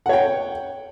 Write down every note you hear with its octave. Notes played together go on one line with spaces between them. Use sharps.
C#5 F#5 G5